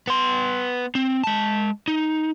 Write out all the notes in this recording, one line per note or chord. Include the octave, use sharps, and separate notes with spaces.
B3 C6
C4
G#3 A5
D#4